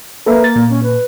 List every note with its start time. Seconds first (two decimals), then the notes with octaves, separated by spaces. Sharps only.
0.26 A#3 A4 B4 E5
0.44 A6
0.56 A#2
0.69 C#4
0.83 B4